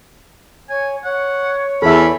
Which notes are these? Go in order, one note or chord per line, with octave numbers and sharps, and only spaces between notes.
C#5 G#5
C#5 F#5
E2 A4 E5 B5